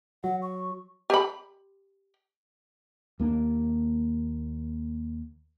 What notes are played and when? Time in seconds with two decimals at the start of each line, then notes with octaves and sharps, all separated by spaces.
0.24 F#3 F#5
0.42 C#6
1.10 G4 B5
3.19 D#2 A#3 D4